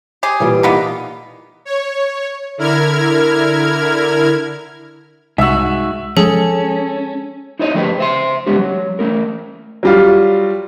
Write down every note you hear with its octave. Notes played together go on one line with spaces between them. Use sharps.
G4 G#4
A#2 E3 G3
A#3 B3 D#4
C#5
D3 E4 A#4 F6 G#6
C2 G#2 F#4 E5 E6
F3 G#3 C#4 G#4 A4
D#4 E4 C5 C#5 D#5
F3 A3 G4 G#4 A#4 B4
C5 E5 C6
G#3 B3 C#4 G4
F#3
A3 C#4 A#4
F#3 G3 F4